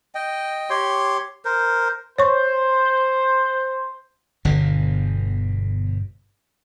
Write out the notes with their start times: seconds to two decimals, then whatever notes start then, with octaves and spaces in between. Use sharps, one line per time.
0.15 D#5 G5
0.70 G4 C#5 C6
1.45 A#4 C5
2.18 C5 C#5 C#6
4.45 G1 B2 D3